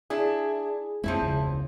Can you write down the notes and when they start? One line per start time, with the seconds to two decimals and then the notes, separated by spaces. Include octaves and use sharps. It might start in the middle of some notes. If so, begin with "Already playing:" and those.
0.10 D4 E4 G#4
1.04 F2 F3 G#3 C4 E4
1.21 E1 C#2 C#3